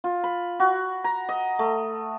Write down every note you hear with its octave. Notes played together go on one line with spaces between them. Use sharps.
F4
B5
F#4
A#5
D#5
A3